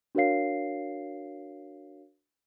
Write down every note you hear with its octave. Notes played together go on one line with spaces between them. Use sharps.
D4 F#4 A#4 C#5 F5 C7